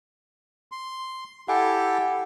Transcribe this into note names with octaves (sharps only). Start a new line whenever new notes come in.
C6
E4 G4 A4 F#5 G#5